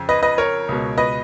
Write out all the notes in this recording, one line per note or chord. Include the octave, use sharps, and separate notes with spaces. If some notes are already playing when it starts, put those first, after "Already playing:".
Already playing: F2 C#3
B4 D#5
B4 D#5
A#4 C#5
C#2 B2
B4 D#5